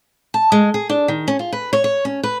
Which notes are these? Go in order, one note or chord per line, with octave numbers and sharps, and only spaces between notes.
A5
G#3
G#4
D4
D#3
C#4
F4
B4
C#5
C#5
C#4
B4